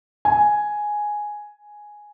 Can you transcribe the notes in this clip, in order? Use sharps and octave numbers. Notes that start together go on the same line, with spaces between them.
G#5